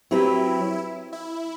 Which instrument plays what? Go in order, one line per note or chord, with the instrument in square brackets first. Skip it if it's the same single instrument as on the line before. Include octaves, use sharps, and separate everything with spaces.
[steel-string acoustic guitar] F#3 C4 G4 B4 [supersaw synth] E4
[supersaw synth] E4